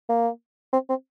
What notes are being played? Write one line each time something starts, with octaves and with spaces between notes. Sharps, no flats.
A#3
C4
C4